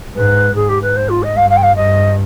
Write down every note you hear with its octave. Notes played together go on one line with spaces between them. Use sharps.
G#2 B4
G#2 G#4
G4
B4
C5
F4
D#5
G2 F5
F5
G5
F5
G2 D#5